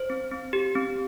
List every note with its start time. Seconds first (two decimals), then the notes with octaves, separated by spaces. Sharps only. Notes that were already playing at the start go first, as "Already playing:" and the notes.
Already playing: C5
0.10 C4
0.32 C4
0.53 G4
0.75 C4